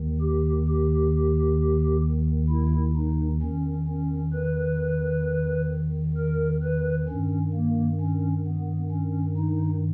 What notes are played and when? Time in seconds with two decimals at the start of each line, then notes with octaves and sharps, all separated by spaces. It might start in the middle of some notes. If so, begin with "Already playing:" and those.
Already playing: D#2 D#3
0.21 G4
0.68 G4
2.50 E4
2.96 D#4
3.42 E2 D#3 C#4
3.88 C#4
4.33 B4
6.17 A#4
6.63 B4
7.08 G2 D#3 C#4
7.54 A#3
8.01 C#4
8.47 B3
8.91 C#4
9.37 D#4